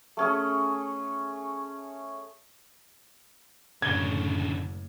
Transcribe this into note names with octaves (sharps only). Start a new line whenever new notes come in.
A3 C#4 G#4
F#1 A2 D3 C#4 G#6 G7